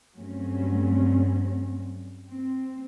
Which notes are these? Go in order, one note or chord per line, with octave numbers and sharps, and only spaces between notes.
G2 F#3 A3 C4 C#4
C4